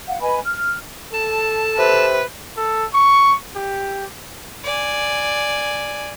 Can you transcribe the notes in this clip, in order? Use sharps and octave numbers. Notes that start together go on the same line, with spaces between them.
F5 F#5
B4 D#5 G#5 B5
F6
A4 A5
C3 B4
A4
C#6
G4
D5 G#5